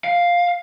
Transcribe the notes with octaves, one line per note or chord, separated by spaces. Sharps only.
F5